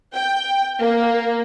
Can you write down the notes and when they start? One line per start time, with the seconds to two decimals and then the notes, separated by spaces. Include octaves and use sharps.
0.14 G5
0.81 A#3